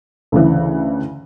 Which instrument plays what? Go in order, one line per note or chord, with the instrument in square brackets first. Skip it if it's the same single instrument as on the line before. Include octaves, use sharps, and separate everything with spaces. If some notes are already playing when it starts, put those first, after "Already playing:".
[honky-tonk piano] D2 C#3 E3